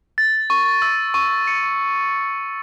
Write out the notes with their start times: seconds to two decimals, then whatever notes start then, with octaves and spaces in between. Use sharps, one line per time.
0.18 A6
0.50 C#6
0.82 E6
1.14 C#6
1.47 C#7